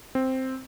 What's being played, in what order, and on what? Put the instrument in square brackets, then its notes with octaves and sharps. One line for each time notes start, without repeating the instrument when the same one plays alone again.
[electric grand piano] C4